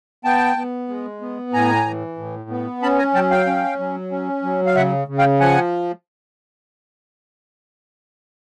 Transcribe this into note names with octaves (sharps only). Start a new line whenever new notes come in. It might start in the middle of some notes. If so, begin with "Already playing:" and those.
B3 G5 A5
B3
G#3
B3
A2 G#5 A#5
E3
A2
B3
C#4 A5 B5
G#5 A#5
F#3 G5 A5
F5 G5
C#4
F#3
C#4
F#3
F5
C#3 E5 F#5
C#3
F5 G5
F3 F#5 G#5